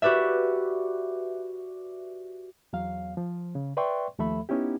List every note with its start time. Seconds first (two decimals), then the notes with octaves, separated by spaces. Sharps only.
0.02 F#4 G4 B4 D5 E5
2.73 E2 F#3 F5
3.17 F3
3.55 C#3
3.77 B4 D5 E5 G5 C6 C#6
4.19 D#2 F3 A3 A4 E5 B5
4.49 B3 C#4 D#4 E4 G4